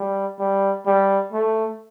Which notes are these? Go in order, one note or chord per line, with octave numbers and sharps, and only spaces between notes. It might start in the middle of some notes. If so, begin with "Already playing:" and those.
Already playing: G3
G3
G3
A3